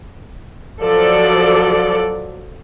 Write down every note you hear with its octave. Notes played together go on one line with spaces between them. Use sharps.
F3 F#3 A4 D5